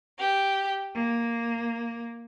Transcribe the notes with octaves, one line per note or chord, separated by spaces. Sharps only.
G4
A#3